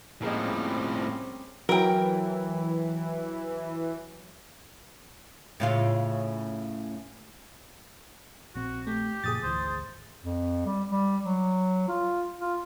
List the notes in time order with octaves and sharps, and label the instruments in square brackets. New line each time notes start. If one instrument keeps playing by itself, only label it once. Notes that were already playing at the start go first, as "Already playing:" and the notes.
[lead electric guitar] A2 F3 [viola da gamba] G3 C4 C#4 [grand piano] A#3 G#4 D#5
[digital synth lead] E3 [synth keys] F#3 [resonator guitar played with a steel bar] A#4 G5
[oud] A2 C#3 F4
[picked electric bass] A#1 C4 [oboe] F#4
[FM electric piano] A3 [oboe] G4
[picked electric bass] F#1 A#2 F3 [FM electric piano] G#4 D#6 A6
[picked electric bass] G#1 D2 E3 [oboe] C5
[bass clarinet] F2
G3
G3
F#3
F4
F4